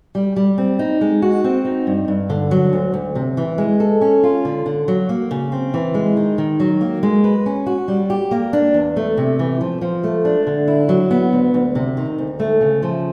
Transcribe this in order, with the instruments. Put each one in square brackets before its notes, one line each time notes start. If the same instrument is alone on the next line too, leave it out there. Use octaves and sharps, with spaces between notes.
[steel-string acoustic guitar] G3
G3
C4
D#4
G#3
F#4
C4
D#4
G2
G2
D3
F#3
D2
D2
C3
E3
G#3
A4
C#4
F4
D3
D3
F#3
A#3
C#3
C4
E3
G#3
D#3
D#3
F#3
A#3
G#3
B4
C#4
F#4
G3
G4
A#3
D4
E2
A3
C3
E3
F3
F3
A3
D4
D3
E4
F#3
B3
D2
D2
C3
D#3
D2
A3
C#3
F3